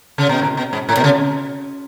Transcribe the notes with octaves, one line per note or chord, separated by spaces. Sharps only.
C#3
B2
A2
B2
G#2
A2
B2
C#3